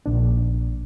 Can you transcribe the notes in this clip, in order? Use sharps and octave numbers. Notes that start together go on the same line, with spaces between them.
A#1 D4